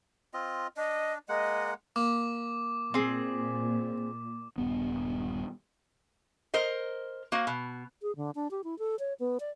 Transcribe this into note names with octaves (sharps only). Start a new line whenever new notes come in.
C4 F4 D#5
D4 D#5
G#3 A#3 D#5 F#5
A#3 D6
A#2 C4 G#4
D#1 G2 B3
A#4 C5 D#5
A#3 F#4 C5
B2
G#4
D3
D4
G4
E4
A4
C#5
B3
D5